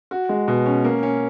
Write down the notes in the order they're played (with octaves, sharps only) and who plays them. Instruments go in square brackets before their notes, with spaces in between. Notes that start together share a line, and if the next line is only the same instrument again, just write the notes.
[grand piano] F#4
G#3
B2
C#4
A#3
C#4